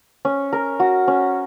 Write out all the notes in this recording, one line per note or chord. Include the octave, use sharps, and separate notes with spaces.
C#4
A#4
F#4
C#4